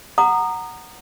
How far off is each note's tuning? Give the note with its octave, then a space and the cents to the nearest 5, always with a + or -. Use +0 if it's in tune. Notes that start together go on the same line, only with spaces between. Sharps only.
F#5 +0 A#5 -10 D#6 -25